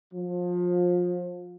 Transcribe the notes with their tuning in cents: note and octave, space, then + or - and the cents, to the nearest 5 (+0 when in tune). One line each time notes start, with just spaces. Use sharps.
F3 +25